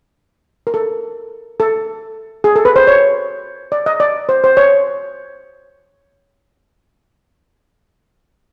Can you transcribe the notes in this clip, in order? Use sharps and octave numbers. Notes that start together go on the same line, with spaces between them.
A#4
A4
A4
G#4
A4
B4
C5
C#5
D5
D#5
D5
C5
C5
C#5